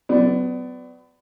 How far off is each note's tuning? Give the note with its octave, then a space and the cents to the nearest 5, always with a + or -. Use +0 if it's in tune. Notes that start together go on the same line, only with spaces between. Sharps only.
F#3 +0 B3 +30 D5 +0